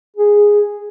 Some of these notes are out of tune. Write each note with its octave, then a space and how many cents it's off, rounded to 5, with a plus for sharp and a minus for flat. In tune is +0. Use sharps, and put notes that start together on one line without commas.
G#4 -5